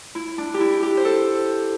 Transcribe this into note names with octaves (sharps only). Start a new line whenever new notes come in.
E4
D4
G4
E4
G4
C5
A4